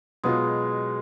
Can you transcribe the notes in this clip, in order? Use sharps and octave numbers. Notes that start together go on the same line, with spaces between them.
B2 F#3 G#3 B3 F4